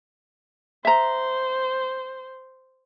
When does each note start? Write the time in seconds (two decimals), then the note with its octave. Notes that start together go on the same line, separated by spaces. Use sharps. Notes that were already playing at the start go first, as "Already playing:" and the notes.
0.85 C5 E5 A#5